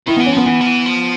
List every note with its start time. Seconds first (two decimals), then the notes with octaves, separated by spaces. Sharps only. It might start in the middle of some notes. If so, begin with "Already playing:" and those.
0.07 D#3 E4
0.17 E3 B3
0.26 C#4
0.33 F3 B3
0.46 E3 B3
0.61 F3
0.66 E3
0.86 F3